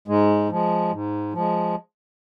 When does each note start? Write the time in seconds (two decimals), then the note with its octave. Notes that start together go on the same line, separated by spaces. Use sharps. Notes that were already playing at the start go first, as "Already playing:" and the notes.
0.08 G#2 G#3
0.50 F3 G#3
0.92 G#2
1.34 F3 G#3